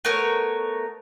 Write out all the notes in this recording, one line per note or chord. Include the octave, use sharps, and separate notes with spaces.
A3 B3 A#4 C#5